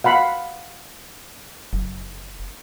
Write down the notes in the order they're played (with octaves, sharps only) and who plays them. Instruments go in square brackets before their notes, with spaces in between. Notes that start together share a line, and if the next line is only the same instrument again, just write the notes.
[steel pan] F5 F#5 B5
[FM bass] F#1